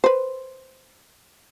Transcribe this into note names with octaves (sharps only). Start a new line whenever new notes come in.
B4 C5